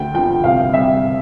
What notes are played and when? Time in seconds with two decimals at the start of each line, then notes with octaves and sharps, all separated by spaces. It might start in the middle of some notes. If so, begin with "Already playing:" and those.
Already playing: D2 G5
0.14 D3 F3 G5
0.44 C2 F5
0.73 C3 G3 E5